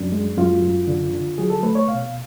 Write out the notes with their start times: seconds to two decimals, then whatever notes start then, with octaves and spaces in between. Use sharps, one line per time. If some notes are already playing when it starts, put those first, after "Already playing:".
Already playing: F#2 D4
0.12 G#3
0.37 F#2 F4
0.63 F#2
0.87 D3
1.13 D3
1.38 F#3 G#4
1.50 A4
1.63 A3 B4
1.75 C#5
1.88 B2 F5